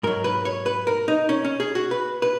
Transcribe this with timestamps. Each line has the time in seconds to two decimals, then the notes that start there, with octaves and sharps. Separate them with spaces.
0.03 G#2 F#3 A#4
0.24 B4
0.45 C#5
0.66 B4
0.87 A#4
1.08 D#4
1.29 C#4
1.45 C#4
1.60 G#4
1.75 F#4
1.91 B4
2.22 B4